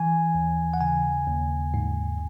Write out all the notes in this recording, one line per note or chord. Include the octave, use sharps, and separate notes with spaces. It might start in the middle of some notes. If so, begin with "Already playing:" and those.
Already playing: E3 G#5
D#2
F#5
C#3 G#5
D#2
G#2